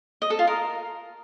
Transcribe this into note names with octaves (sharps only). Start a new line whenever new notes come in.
D#5
A4
F4
A#4